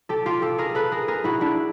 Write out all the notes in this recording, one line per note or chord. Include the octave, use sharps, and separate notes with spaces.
G4 A4
F4 G4
G4 A4
G#4 A#4
A4 B4
G#4 A#4
G#4 A#4
E4 F#4
D4 E4